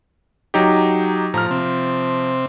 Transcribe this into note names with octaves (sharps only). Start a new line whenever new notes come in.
F#3 D#4 G4
A2 F3 A#5 F6
C3 C4